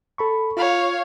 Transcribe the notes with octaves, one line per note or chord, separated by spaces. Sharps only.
A4 B5 C#6
F4 C#5 F5